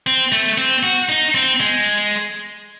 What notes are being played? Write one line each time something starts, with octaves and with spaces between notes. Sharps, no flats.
C4
A3
C4
F#4
D#4
C4
G#3